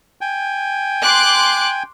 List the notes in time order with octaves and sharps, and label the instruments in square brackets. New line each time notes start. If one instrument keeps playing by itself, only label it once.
[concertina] G5 G#5
[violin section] C6 D6 F#6